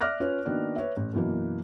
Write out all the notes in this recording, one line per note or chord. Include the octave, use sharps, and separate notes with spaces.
D5 E5 D6 F6 F#6 A#6
C#4 F4 B4 C#5
D#3 A#3 B3 D4 F#4
B4 C#5 E5
A1
F#2 B2 E3 A#3